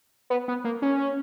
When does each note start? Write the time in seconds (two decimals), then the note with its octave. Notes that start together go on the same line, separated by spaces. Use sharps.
0.30 B3
0.48 B3
0.64 A#3
0.82 C#4